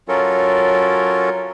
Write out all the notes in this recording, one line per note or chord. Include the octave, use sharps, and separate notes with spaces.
F#3 C#4 F4 A4 A#4